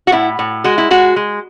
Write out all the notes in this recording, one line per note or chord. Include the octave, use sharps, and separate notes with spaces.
F#4
A2 E4
A2
G#3 F#4
E4
G#3 F#4
G#3